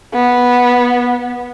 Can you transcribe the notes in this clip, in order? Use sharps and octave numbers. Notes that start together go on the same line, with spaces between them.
B3